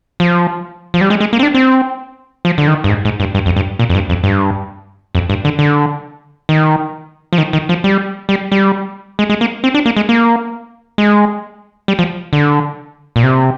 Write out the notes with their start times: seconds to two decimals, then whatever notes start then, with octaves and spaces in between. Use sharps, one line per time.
0.20 F3
0.94 F3
1.01 G3
1.10 G#3
1.20 G#3
1.33 A#3
1.39 C4
1.43 D4
1.54 C4
2.45 F3
2.58 D3
2.68 D#3
2.84 G2
2.89 G#2
3.05 G#2
3.20 G2
3.35 G2
3.46 F2
3.56 G2
3.79 A#2
3.90 F2
3.95 G2
4.09 F2
4.24 G2
5.15 F2
5.30 G2
5.45 D3
5.59 D3
6.49 D#3
7.33 F3
7.38 D#3
7.53 D#3
7.69 F3
7.84 G3
8.29 G3
8.52 G3
9.19 G#3
9.30 G#3
9.41 A#3
9.64 C4
9.74 D4
9.86 A#3
9.97 G#3
10.09 A#3
10.98 G#3
11.88 G3
11.99 F3
12.33 D3
13.16 A#2
13.23 C3